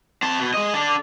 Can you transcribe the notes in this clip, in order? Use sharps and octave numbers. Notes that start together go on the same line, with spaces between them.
C4 A5
B2
G#3 D#5
D4 A4